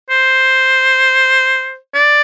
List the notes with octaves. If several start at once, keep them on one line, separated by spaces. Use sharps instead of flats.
C5
D5